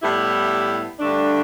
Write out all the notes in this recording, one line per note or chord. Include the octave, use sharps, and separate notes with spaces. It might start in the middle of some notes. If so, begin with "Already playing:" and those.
A2 G3 B3 E4 G4
G2 D3 A3 D4